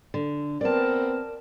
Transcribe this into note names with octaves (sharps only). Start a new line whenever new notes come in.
D3
B3 C4 A#4 B4 D5 A5